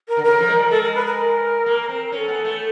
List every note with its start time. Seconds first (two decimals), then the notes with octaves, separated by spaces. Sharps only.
0.08 A#4
0.17 D3
0.24 C#3 A#4
0.40 F3
0.48 G#3
0.56 G3
0.71 G#3 A4
0.83 A#4
0.95 B4
1.07 A#4
1.66 A#3
1.89 C4
2.12 C#4 A#4
2.17 A4
2.28 B3
2.45 A3